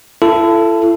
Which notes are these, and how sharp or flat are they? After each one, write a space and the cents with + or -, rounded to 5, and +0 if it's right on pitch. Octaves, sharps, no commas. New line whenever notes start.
E4 +40 A4 +0